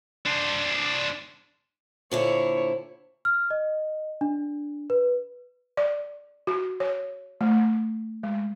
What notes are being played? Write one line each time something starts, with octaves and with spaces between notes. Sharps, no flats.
D4 C5
A#2 D3 E4 C5 C#5
F6
D#5
D4
B4
D5
F#4
C#5
A3
G#3